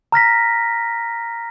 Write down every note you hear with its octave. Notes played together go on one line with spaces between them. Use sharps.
A#5 F6 A#6 B6